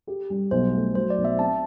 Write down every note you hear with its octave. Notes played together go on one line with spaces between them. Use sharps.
G4
G3
B1 C5
A3
F#3 C5
D5
B1
E5
C4 A5